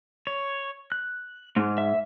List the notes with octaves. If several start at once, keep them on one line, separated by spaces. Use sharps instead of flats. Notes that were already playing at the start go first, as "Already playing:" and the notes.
C#5
F#6
G#2
E5